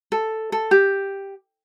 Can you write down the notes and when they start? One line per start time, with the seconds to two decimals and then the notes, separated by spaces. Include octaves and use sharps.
0.12 A4
0.52 A4
0.71 G4